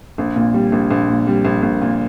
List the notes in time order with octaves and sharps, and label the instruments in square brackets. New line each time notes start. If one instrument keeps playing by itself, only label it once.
[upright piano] A#1
A#2
G3
A#1
A#1
A#2
G3
A#1
A#1
A#2